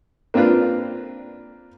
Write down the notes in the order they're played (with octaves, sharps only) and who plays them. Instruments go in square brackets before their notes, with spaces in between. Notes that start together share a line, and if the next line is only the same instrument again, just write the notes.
[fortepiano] A#3 C4 D4 F4 B4